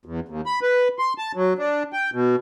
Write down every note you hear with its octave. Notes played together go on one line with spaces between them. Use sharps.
E2
D#2
B5
B4
C6
A5
F#3
D4
G5
B2